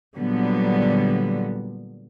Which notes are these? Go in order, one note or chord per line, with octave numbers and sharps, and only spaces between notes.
A#2 D3 F#3 G3 B3